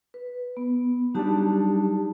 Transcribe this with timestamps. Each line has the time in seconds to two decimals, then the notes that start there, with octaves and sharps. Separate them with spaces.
0.14 B4
0.57 B3
1.15 F#3 G3 D4 D#4 G4 A5